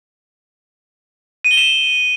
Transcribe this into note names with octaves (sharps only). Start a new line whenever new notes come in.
D#7
G7
E7